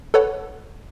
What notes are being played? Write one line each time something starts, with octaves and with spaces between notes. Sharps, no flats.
A4 B4 C#5 F#5